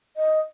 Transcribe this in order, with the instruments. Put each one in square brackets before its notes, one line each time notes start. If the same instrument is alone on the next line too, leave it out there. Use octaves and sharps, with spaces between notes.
[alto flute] D#5